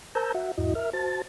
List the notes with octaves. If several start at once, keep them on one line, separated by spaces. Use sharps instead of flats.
A#4 C5 A5 A#5 E6 G6
F#4 E5 F#5
E2 G#2 E4 F#4 D#5
A#4 E5 F6
F#4 C5 A5 A6